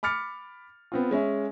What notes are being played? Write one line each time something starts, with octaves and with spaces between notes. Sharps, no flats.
B5 D6 F6 A6 C#7
B3 C4 F4
G#3 C#4 E5